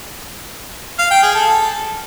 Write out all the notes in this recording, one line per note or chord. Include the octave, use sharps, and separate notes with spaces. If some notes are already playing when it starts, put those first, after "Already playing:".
F5
G5
G#4
A4